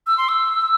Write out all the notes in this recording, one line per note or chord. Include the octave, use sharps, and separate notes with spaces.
E6
C6
E6